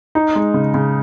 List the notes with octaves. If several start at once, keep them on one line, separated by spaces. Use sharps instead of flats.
D#4
G#3
C#3
C#3